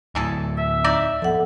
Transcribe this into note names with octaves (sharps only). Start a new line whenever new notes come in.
D2 A2 E3 G#4 A4
E5 E6
D#4 D5
F3 B3 A4 F#5